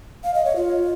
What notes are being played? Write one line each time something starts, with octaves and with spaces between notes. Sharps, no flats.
F5
D#5
C#5
F4